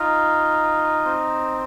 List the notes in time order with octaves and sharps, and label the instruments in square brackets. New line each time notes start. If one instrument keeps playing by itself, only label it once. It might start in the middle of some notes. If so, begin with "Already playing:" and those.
Already playing: [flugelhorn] D#4 [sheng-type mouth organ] F4
[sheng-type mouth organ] C4